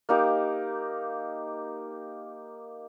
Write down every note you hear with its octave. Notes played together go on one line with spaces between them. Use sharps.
A#3 D#4 G4